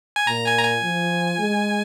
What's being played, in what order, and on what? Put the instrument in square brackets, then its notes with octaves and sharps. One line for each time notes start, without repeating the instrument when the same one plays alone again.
[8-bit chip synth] G#5
[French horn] A#2 [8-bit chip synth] A#5
[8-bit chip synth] G#5
A#5
G#5
[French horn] F3
G#3